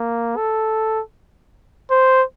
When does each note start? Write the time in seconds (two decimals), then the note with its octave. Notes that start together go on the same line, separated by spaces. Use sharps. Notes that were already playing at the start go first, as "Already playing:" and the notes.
Already playing: A#3
0.36 A4
1.90 C5